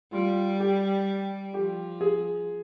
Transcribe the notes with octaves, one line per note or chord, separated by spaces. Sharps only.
G3 F4
G4
F3 G4
G#4